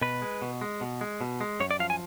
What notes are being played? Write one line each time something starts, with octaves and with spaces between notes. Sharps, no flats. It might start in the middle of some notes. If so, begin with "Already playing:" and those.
B2 B4
G#3
B2
G#3
B2
G#3
B2
G#3
F#2 C#5
D5
F3 F5
G#5